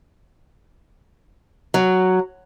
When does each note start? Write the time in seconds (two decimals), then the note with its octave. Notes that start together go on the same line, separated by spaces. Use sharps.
1.74 F#3